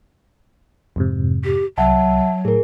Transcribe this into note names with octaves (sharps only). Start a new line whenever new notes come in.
F2 G#2 C3
G4
C2 F#3 E5 F#5 A5
A2 G#4 A#4